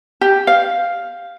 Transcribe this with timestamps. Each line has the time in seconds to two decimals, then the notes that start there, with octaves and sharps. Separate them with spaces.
0.21 G4
0.47 F5